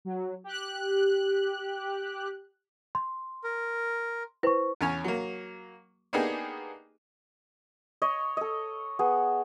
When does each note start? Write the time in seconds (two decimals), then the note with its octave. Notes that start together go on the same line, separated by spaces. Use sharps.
0.05 F#3
0.44 G4 F#6
2.95 C6
3.44 A#4
4.43 E4 B4 C5 C#6
4.81 E2 C#4 C#5 G#5
5.04 F#3 A#3
6.13 A#3 B3 D4 D#4 G4 G#4
8.02 C#5 D#5
8.37 A4 D#5
8.99 B3 G#4